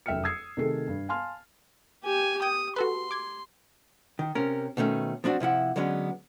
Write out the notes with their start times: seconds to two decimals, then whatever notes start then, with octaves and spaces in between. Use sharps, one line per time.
0.06 F1 F#2 E5 G5 F6 C#7
0.24 D#6 E6 G#6 C7
0.57 C3 D#3 A3 G#4 A4 C7
0.88 G2
1.08 F5 G#5 A5 C6 F6
2.04 G4 G#5
2.42 G5 D#6 G6 G#6
2.76 F#4 A4 B4 C6
3.11 D6 G#6
4.19 D#3
4.35 C3 C#4 A#4
4.77 B2 D#3 A3 C#4
5.24 F3 C4 D4 F#4
5.40 C3 F3 E4 F#5
5.76 D3 F#3 G#3 B3 C#4